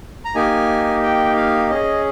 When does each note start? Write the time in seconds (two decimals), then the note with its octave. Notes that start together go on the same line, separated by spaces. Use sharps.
0.25 A#5
0.35 A#3 D#4 G4 G#5
1.02 G5
1.36 F5
1.70 C#4 G#4 D#5